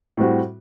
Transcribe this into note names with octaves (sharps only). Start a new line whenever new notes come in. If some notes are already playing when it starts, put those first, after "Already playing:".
A2 G3 C4 F#4